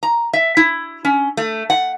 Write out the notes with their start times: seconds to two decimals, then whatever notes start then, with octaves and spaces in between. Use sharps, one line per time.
0.03 A#5
0.33 E5
0.57 E4
1.05 C#4
1.37 A3
1.70 F#5